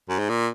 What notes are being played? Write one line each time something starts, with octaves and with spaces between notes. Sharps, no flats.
F#2
G#2
A#2